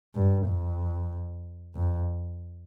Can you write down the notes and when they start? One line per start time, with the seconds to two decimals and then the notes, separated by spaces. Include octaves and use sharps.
0.15 G2
0.47 F2
1.75 F2